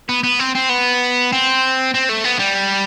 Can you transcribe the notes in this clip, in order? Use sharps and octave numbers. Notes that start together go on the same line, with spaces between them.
B3
B3
C4
C4
B3
C4
C4
A3
B3
G3